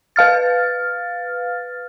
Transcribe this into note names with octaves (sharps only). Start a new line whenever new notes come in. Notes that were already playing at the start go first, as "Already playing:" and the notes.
B4 F5 F6 A6